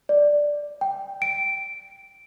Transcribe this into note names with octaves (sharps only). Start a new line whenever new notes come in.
D5
G5
D7